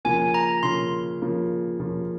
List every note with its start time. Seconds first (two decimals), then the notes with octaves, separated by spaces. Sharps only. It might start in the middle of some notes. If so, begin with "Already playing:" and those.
0.05 C#3 F3 A#3 G#5
0.34 A#5
0.63 C#3 F3 A#3 C6
1.22 C#3 F3 A#3
1.80 C#3 F3 A#3